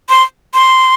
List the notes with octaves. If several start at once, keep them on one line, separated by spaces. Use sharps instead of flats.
C6
C6